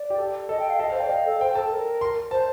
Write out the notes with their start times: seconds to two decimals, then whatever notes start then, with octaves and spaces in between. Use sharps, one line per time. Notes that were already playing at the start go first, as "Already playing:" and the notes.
Already playing: D5
0.10 G4
0.18 A4
0.49 A4 D#5
0.60 G5
0.70 F5
0.79 A4 D#5
0.90 C5 F5
1.00 D5 G5
1.09 D#5 F5
1.26 A4
1.40 C5 G5
1.55 A4 A5
1.71 A#4
2.01 C6
2.31 C5 A5